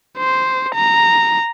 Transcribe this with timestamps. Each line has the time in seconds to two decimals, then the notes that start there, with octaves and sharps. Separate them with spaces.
0.18 C5
0.75 A#5